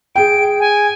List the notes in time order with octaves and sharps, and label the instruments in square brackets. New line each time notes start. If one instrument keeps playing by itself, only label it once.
[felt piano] G#4 G5 [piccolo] D7
[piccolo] G#5